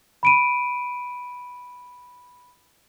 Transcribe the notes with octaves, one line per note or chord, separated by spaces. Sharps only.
B5 D7 D#7